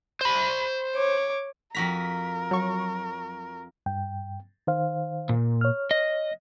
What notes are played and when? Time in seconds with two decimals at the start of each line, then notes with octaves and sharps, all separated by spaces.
0.21 C5 B5
0.95 C#5 D6
1.75 F2 F#4 A#4 A#5 B6
2.51 F#3 C#6
3.86 G2 G5
4.67 D#3 C5 F5
5.29 A#2
5.61 C#5 F6
5.91 D#5